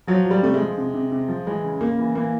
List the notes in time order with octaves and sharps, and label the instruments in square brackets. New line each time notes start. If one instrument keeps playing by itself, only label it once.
[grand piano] F3 F#3
F3
G3
C3 A3
G#3
F3
C3
C3
C3
F3
E3 G#3
C#3
C#3 A#3
E3
E3 A#3